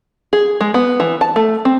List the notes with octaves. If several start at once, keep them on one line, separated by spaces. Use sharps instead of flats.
G#4
G#3
B3
E3
A5
A3
C4